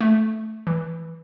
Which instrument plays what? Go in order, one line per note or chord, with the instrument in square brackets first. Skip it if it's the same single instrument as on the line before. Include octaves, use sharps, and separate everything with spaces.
[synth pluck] A3
E3